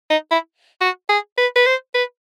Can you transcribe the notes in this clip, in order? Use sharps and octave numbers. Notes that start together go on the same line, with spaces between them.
D#4
E4
F#4
G#4
B4
B4
C5
B4